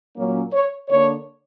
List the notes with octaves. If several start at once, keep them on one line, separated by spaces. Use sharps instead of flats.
A#2 F#3 A#3 C#4
C#5
D3 A#3 D4 C#5